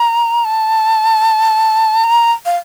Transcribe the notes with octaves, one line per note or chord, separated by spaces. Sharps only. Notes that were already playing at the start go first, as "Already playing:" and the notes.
Already playing: A#5
A5
A#5
F5